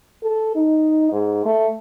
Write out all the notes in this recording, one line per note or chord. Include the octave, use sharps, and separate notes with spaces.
A4
D#4
G#2
A3